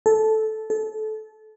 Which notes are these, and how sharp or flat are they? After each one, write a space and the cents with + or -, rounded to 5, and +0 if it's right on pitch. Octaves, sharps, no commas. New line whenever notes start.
A4 -10
A4 -25